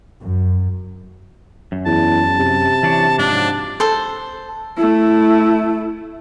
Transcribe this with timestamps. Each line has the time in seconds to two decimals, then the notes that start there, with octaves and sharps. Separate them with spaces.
0.20 F#2
1.72 F#2
1.86 E2 A5
2.39 C3
2.83 E3 D4 C#5
3.19 G#2 F3 F#3 D4
3.80 A4 C5
4.77 A3 E4